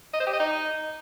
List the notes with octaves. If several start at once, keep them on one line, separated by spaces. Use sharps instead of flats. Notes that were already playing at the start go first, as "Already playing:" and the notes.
D#5
C5
G4
D#5
D#4